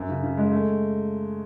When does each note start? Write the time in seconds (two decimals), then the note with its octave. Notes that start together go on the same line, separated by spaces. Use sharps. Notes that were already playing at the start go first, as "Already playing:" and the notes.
Already playing: F#2
0.09 C#3
0.23 C#3
0.37 G#3
0.52 A3